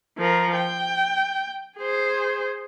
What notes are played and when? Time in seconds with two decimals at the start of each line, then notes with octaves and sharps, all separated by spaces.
0.18 F3 A#4
0.56 G5
1.78 G#4 C5